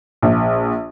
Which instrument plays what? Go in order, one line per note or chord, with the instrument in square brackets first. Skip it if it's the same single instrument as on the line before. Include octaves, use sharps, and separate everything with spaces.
[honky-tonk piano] A#1